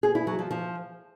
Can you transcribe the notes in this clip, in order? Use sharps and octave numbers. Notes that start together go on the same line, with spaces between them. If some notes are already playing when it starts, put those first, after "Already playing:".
G#4
E4
F#3
F3
F3